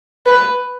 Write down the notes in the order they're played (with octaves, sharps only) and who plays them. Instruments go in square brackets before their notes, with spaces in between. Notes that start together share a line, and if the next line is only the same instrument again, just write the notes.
[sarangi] B4